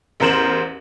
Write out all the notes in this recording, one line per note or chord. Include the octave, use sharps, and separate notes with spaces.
A1 E2 A#4 C5 E7 F#7